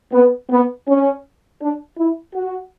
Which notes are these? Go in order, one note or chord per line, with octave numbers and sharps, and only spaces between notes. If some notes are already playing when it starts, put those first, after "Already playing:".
B3
B3
C#4
D4
E4
F#4